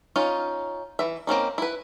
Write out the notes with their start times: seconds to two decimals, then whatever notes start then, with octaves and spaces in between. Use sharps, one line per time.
0.16 C#4 D#4 F4
0.99 E3 E5
1.27 A#3 C4 C#4 D#4
1.58 E4 B4